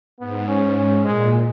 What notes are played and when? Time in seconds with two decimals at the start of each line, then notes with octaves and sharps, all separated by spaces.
0.20 G#2 B3
0.48 C#4
0.77 C#4
1.04 A#2 G#3